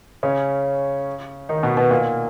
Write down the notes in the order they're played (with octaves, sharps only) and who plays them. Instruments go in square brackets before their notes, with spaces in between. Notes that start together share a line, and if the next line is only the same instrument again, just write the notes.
[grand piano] C#3 C#4
D#3 D#4
B2 B3
B2 B3
A#2 A#3